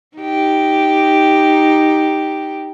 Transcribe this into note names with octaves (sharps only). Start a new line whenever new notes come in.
D#4 G4